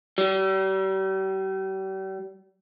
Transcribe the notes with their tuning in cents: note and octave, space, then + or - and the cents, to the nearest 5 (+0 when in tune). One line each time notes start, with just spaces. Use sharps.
G3 -40